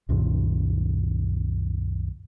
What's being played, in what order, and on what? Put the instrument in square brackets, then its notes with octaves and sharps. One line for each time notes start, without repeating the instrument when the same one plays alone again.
[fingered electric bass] C2 F#2 A#2 D#3